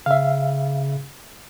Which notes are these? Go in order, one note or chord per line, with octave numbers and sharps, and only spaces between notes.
C#3 E5 F5